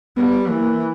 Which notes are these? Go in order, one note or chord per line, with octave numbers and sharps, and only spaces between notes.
G3 B3
E3 A#3